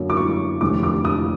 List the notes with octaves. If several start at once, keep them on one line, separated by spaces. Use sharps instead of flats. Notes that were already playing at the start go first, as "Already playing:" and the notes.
Already playing: F#2 D3 F#3 A#3
D6
C#6
F1 D#2 D3 F3 D6
D6
D#6